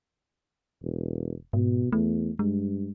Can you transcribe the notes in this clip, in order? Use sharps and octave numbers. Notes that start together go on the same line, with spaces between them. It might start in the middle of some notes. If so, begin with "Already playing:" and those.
E1
G#2 B2
E2 A3
G2 G#3